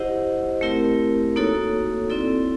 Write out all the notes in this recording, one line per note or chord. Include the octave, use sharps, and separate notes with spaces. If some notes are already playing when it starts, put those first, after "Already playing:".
Already playing: E4 G4 C5 D#5 F#5
A3 C4 E4 G4 A#4
A#3 D#4 F#4 A4 C#5
C4 E4 A4 D5